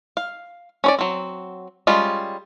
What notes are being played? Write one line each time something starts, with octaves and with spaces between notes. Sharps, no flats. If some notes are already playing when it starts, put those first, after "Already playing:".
F5
C#4 C#5 D5
F#3 C4
G3 G#3 C#4 F4